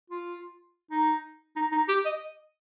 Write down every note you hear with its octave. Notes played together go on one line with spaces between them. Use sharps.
F4
D#4
D#4
D#4
G4
D#5